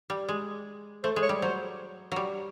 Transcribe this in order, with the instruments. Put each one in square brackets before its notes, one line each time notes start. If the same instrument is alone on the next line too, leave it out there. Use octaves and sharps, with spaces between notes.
[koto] G3
G#3
[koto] A3 [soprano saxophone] C5
[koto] G#3
[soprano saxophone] C#5
[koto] G3
[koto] F#3 [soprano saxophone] C5
[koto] F#3 G3